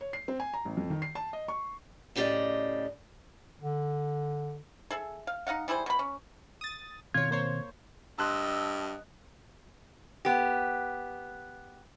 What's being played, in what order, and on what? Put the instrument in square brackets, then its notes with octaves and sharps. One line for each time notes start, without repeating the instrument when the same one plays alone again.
[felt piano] C#5
C7
C4
G#5
A#5
A1
F2
D#3
C7
A5
D#5
C#6
[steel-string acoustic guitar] A2 C#3 G4 A#4 D5 D#5
[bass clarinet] D3
[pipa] G#4 A4 E5
F5
D#4 D#5 F5 F#5
G3 E4 G#4 C5
B2 B5
C#4
[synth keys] D#6 A6
[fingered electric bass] B2 D#3 C4 [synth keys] F4 C#5 [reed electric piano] G#6
[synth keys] A#3 C5 C#5
[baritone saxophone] G2 [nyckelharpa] D#5 [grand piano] A5 C6 F#6 [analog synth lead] E6
[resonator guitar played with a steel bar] B3 G4